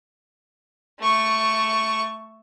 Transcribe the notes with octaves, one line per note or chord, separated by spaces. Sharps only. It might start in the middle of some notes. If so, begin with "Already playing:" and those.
A3 C#6